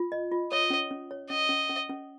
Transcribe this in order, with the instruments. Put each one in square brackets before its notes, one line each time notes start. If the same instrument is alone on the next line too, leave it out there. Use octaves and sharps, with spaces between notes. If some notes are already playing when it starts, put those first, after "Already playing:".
Already playing: [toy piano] F4
D#5
F4
[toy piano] C#5 [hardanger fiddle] D#5
[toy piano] C#4
C#4
C#5
[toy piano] C#4 [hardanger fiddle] D#5
[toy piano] C#4
C#4
C#4